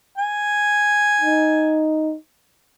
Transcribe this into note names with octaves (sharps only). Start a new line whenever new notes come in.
G#5
D#4